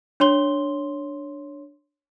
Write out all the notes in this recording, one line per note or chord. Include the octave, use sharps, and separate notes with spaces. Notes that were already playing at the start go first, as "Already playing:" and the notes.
D4 C#5 C6 G7